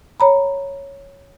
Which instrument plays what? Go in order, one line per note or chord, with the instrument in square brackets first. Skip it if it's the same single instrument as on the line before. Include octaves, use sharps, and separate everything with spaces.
[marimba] C#5 A#5 B5